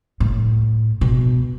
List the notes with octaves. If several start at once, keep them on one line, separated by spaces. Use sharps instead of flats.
A2
B2